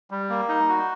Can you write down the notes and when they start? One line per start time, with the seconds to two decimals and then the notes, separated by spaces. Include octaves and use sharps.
0.11 G3
0.30 A#3
0.48 D#4
0.69 F#4